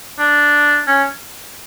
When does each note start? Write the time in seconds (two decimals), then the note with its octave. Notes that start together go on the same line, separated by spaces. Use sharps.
0.19 D4
0.88 C#4